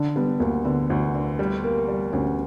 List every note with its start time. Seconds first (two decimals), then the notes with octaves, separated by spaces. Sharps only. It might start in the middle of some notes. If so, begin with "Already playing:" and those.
Already playing: D3 D4
0.16 G3 B3
0.40 D2 A#3
0.65 D3 B3
0.90 D2
1.14 D3
1.39 G3
1.64 A#3
1.88 G3
2.13 D2 C#4